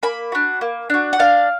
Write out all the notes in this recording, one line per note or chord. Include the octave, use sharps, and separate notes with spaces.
A#3 B5
D4 F#4
A#3
D4 F#4
F#5
D4 F5